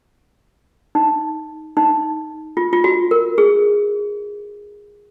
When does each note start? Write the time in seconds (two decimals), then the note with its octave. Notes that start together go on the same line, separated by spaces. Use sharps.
0.95 D#4
1.77 D#4
2.57 F4
2.73 F4
2.84 F#4
3.11 A#4
3.38 G#4